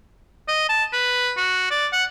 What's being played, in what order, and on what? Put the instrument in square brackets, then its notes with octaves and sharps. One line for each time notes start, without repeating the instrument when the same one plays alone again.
[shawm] D#5
A5
B4
F#4
D5
F#5